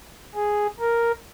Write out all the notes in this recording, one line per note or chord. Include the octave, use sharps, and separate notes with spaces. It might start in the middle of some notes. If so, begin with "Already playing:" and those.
G#4
A#4